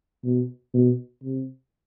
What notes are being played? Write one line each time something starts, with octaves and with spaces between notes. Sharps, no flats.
B2
B2
C3